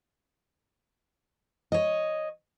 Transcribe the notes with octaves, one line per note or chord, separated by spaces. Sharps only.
C#5 D#5